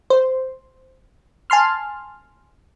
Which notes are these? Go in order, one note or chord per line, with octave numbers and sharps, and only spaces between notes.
C5
G#5 A5 C6 F6